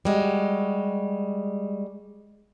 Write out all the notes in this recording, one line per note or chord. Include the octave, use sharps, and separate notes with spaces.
G3 G#3 F#4